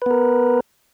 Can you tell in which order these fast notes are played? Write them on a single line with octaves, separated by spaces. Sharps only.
B4 B3 A#4